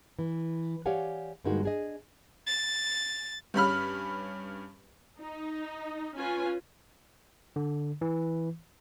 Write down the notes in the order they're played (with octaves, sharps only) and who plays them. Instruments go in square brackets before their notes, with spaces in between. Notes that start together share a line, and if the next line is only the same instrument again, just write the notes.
[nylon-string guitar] E3
G4 C#5 D5 F5 F#5 G#5
G2 D3 G#3 A#3 D#4 F#4
D4 G#4 D#5
[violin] A6
[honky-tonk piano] G2 C#4 B5 F6
[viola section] D#4
C#4 F4 B4 G#5
[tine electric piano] D3
E3